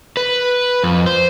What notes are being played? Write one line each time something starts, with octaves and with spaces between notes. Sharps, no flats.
B4
F2
C5